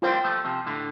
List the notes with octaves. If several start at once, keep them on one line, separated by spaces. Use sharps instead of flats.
G3 C4 F4 C5 G5
F3 A3
C3 F3
A2 D3